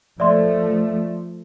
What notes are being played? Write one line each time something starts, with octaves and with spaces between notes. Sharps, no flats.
F3 A3 D5 E5 C6